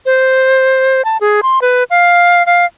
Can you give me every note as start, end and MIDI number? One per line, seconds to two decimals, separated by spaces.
0.06 1.04 72
1.05 1.17 81
1.21 1.41 68
1.43 1.59 84
1.62 1.83 71
1.90 2.45 77
2.46 2.65 77